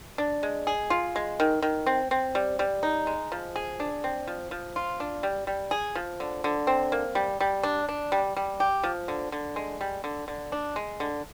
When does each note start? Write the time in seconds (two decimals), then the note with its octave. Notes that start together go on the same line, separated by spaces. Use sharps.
0.18 D4
0.43 G#3
0.67 G#4
0.90 F4
1.16 G#3
1.40 D#3
1.62 D#3
1.86 C4
2.11 C4
2.35 G3
2.59 G3
2.83 D#4
3.07 G#3
3.32 F3
3.56 G#4
3.80 D4
4.04 C4
4.27 F3
4.51 F3
4.76 F4
5.00 D4
5.23 G3
5.47 G3
5.71 G#4
5.95 F3
6.20 D3
6.44 D3
6.67 C4
6.92 A#3
7.15 G3
7.40 G3
7.63 D4
7.89 D4
8.12 G3
8.36 G3
8.60 G4
8.83 F3
9.08 D3
9.32 D3
9.56 G#3
9.81 G3
10.04 D3
10.28 D3
10.52 D4
10.76 G#3
11.00 D3